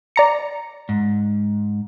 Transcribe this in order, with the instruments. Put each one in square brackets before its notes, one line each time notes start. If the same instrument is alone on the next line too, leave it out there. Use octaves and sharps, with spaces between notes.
[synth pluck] D5 A#5 C#7
[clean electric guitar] G#2